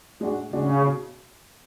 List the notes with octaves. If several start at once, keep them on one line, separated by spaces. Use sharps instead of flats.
A2 G#3 D4 F#4
A2 C#3 G#3 D4 F#4
B2